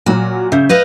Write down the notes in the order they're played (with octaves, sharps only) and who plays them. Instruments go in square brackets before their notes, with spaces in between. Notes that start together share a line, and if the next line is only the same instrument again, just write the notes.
[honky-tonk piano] A#2 F#3 [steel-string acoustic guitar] F#4
[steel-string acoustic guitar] C#3 [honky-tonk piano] E5 G6
[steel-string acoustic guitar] B4 D#5 F5